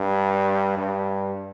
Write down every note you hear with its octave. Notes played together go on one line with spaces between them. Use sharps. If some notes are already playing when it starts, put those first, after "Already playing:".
Already playing: G2
G2